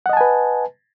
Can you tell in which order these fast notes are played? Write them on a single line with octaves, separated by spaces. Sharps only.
F#5 D#5 A5 G#5 B4